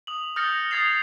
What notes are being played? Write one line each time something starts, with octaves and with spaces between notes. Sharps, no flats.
D#6 F#7
D#6 F6 G6 A6 A#6 C#7
D#6 G#6 A6 C7 F7